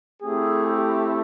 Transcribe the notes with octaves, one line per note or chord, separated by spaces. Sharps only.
A3 C4 E4 G4 G#4
G4